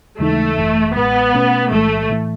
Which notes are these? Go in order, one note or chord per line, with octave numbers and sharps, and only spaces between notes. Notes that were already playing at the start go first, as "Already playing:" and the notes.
D#2 C#3 E3 G#3 A3 D#4
G#1 F#2 E3
A1 A2 G#3 B3
B2 A3 C#4
B1 A2 E3 G#3 A3
A2 E3 A3